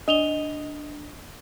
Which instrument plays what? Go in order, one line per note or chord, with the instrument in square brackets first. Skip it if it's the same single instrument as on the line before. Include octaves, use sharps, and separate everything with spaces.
[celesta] D4 F7 G7 [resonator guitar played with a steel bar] D#5